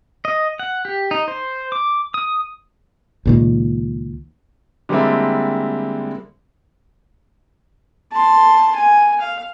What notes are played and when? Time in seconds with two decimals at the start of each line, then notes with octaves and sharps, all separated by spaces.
0.25 D#5
0.59 F#5
0.85 G4
1.11 D#4
1.28 C5
1.72 D6
2.14 D#6
3.25 C#2 A#2 D#3
4.89 D3 G3 G#3 A#3 C4 E4
8.12 A5 C6
8.76 G#5
9.21 F5